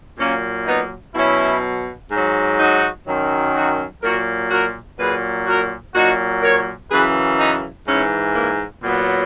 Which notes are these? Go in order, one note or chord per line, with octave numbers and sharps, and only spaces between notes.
A#2 F#3 A#3 C#4
B3 D#4
B2 F#3 C#4 E4
G#2 F#3
D#4 F#4
F#2 D#3 F#3
D#4 F#4
A#2 F#3 F#4 A#4
F#4 A#4
A#2 F#3 G#4 B4
F#4 A#4
A#2 F#3 D#4 F#4
A#4 C#5
F#2 C#3 E3 G#4 B4
B3 D#4
G#2 E3 C#4 E4
A#3 C#4
A#2 F#3 B3